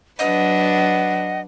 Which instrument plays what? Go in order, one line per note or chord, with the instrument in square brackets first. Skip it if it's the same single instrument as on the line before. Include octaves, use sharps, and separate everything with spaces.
[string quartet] F#3 D4 B4 [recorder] D#5 [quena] F#5